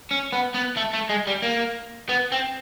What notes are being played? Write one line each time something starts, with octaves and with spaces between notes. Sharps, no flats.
C#4
B3
B3
A3
A3
G#3
G3
A#3
B3
C4